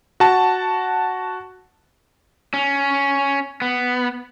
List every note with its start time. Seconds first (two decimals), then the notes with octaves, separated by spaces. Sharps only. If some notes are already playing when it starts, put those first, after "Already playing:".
0.20 F#4 A5
2.54 C#4
3.62 B3